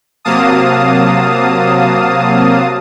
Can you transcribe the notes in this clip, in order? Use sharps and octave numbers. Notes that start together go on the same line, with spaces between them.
C3 F#3 A#3 F5 A5 D#6